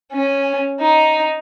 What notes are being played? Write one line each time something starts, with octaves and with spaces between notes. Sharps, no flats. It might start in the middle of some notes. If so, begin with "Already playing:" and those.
C#4
D#4